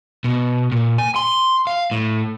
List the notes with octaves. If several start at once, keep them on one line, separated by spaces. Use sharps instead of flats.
B2
A#2
G#5
C6
F5
A2